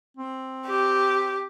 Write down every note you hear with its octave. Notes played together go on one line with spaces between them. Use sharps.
C4
G4